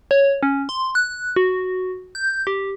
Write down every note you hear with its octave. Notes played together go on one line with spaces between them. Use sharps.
C#5
C#4
C6
F#6
F#4
G6
G4